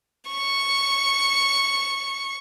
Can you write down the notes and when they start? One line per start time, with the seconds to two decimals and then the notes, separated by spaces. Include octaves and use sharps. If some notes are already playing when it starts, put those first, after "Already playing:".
0.31 C#6 C#7